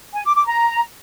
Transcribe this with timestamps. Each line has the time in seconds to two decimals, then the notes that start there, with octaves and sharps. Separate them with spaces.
0.13 G#5
0.24 D6
0.35 D6
0.46 A#5